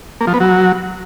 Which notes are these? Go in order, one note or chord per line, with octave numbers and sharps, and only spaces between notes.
A#3
F3
B3
F#3